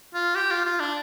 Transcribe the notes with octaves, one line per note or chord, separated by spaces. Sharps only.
F4
G4
F4
F4
D4